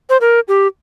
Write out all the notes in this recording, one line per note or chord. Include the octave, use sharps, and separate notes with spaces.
C5
A#4
G4